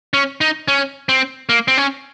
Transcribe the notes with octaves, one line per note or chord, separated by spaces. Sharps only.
C#4
D#4
C#4
C4
A#3
C4
C#4